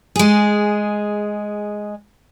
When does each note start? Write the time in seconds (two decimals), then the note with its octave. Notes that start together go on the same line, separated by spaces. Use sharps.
0.16 G#3 G#4